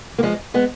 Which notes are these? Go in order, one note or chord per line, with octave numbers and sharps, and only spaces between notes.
A#3
F3 G#3
G#3 B3